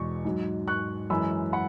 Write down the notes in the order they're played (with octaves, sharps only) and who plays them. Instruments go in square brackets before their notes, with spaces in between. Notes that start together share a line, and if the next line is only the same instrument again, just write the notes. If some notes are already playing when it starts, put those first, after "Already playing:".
Already playing: [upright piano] E2 B2 G#3 C#6
G#2 F#3
C#6 F#6
F#2 E3 G#3 B5 E6
F#5 B5